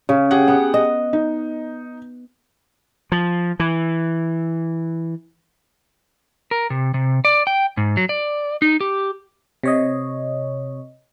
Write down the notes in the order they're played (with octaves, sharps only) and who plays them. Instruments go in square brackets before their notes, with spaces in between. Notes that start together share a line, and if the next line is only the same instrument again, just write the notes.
[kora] C#3 [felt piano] C#4
[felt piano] G4 G#4 F#5
[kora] B3
D#5
[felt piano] D#4
[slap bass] F3
E3
[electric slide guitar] A#4
C3
C3
D5
G5
G#2
F#3
D5
D#4
G4
[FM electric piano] C3 C#5 D#5